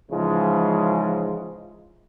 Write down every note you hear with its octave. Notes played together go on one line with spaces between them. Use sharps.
G#2 C#3 E3 F3 G#3